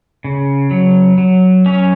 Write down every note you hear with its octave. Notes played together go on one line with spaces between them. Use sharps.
C#3
F#3
F#3
C#4